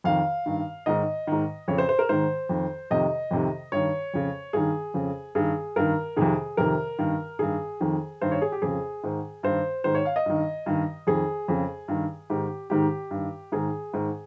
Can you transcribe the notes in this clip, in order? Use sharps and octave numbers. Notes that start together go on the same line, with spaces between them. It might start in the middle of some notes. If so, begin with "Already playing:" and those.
F2 D#3 F5
G2 D#3
G#2 D#3 D#5
G#2 D#3
F2 C#3 C#5
C5
C5
A#4
G#2 D#3 C5
F2 D#3
F2 C3 D#3 D#5
F2 C3 D#3
G2 D#3 C#5
F2 C#3
G2 D#3 G#4
F2 C#3
G2 D#3 G#4
G2 D#3 A#4
F2 C3 D#3 G#4
F2 C3 D#3 A#4
G2 D#3
G2 D#3 G#4
F2 D#3
G2 D#3 C5
C#5
G#4
G4
F2 C#3 G#4
G#2 D#3
G2 D#3 C5
G#2 D#3 C5
C#5
F5
D#5
G2 D#3
G2 D#3
F2 D#3 G#4
F2 C#3
G2 D#3
G#2 D#3 G4
G#2 D#3 G4
G2 D#3
G#2 D#3 G#4
G#2 D#3